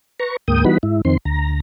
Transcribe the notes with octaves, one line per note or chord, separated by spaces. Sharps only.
B4 A#5 C#6
D2 G#2 A#3 G5 D#6
E3 G3 B3 D#4 F#4 B5
G#2 E4
F2 D#3 C4 C6
D2 A#5